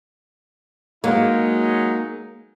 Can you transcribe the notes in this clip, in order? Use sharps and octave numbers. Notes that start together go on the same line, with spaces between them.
F#3 G#3 A#3 D#4